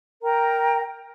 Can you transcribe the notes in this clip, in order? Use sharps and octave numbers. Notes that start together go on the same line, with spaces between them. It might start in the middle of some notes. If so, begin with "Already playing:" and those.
A#4 G5 A#5